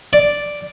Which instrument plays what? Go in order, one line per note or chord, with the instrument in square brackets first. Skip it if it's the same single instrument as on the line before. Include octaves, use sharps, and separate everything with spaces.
[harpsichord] D5